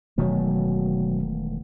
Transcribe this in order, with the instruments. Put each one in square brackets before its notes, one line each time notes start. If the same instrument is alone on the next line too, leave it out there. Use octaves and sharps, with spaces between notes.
[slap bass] E1 D#3 A3 [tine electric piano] B2 F#3